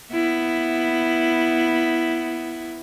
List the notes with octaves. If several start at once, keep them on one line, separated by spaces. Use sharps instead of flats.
B3 E4